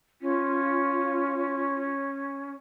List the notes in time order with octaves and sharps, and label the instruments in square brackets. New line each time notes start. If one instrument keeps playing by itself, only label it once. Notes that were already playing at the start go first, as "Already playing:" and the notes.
[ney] C#4 [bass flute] F4